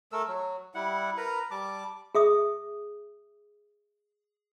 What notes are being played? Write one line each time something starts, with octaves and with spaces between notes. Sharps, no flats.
A3 A4 A#4 E6
F#3
G3 E4 F#5
A#4 B4 A#5
G3 A5 D6
G#4 E5 D#6